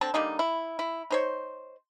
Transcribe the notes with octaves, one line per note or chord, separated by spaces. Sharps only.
D3 C4 A5
D3 G3 A#3 D#4
E4
E4
D#4 C5 C#5